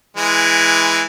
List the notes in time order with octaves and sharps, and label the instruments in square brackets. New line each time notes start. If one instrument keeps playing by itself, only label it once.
[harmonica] E3 G#3